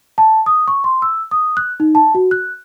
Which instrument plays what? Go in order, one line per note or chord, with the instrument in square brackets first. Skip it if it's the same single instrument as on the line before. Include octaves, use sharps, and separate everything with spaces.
[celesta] A5
D#6
C#6
C6
E6
D#6
F#6
D#4
A5
F#4
F#6